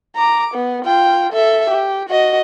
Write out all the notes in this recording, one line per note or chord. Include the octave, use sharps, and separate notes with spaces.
A#5 D6
B3
F4 G5
A4 E5
G4
F#4 D#5